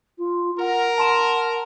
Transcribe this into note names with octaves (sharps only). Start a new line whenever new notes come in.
F4
A#4 F#5
A5 C6 E7